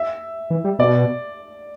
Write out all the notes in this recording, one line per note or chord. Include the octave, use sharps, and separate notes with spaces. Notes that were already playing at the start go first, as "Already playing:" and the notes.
Already playing: E5
E3
G3
B2 D5